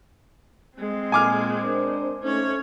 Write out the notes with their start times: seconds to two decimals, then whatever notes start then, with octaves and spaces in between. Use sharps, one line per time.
0.77 G#3 C4
1.12 A#2 G#5 D6 F6
1.64 D4 A#4 C5
2.23 A3 C#4 D#4 C5 C#5